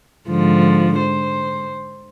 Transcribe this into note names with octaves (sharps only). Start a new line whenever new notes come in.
G#2 D3 F3
C5